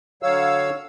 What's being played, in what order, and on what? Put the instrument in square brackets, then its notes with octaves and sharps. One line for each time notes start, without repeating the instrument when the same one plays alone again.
[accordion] D3 F#3 C#5 F5 E6